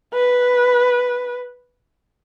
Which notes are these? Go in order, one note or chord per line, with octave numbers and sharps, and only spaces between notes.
B4